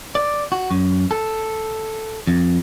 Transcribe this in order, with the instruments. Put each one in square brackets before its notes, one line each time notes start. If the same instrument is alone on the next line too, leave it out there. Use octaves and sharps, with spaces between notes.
[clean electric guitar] D5
F#4
F#2
A4
F2